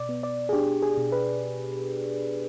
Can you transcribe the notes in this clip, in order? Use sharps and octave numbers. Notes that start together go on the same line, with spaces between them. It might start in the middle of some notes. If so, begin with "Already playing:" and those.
Already playing: B2 D5
B3
D5
G#4
D4 G4
G#4
B2
B4